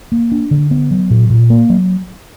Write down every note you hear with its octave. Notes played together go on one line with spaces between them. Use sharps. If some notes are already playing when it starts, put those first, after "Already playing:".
A#3
D4
D3
B3
F#3
A#2
A#2
A#3
F#3